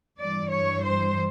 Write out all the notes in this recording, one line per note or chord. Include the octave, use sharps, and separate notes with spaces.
G2 E3 G3 D5
C#5
C5